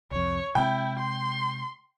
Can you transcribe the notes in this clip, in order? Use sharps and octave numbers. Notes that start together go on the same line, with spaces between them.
C2 F2 C#5
C3 G#3 C4 E4 G5
C6